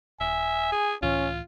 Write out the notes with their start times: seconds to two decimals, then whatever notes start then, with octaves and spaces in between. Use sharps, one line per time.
0.20 D#1 E5 G#5
0.72 G#4
1.02 C#2 A2 E3 C#4 F4